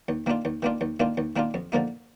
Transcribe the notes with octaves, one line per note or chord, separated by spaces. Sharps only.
D#2
D#3 A#3 D4 F4
D#2
D#3 A#3 D4 F4
D#2
D#3 A#3 D4 F4
D#2
D#3 A#3 D4 F4
F2
D3 F3 A#3 D#4